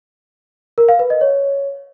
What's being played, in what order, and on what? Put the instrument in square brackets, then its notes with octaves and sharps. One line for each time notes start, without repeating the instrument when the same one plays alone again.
[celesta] A#4
F5
B4
D#5
C#5